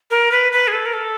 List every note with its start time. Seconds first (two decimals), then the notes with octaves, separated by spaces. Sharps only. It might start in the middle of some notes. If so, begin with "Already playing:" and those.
0.11 A#4
0.32 B4
0.52 B4
0.68 G#4
0.73 A4
0.86 A#4
0.93 A4